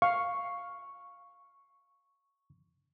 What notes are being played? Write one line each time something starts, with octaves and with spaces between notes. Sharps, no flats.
F5 C#6